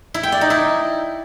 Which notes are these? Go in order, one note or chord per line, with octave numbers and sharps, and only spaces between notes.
E4
G5
D5
D#4
E4